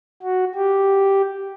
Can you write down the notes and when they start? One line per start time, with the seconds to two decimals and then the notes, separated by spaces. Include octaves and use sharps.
0.23 F#4
0.55 G4